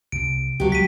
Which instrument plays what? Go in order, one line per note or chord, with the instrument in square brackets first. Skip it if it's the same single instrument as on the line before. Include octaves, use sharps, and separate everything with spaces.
[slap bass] C2 C3 [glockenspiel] D7
[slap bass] C#2 C3 [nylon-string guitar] F#3 G4
[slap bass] G3 G#3 [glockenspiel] B6 D#7